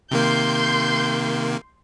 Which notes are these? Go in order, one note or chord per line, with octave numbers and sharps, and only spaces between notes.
C3 D#3 A#3 C6 G6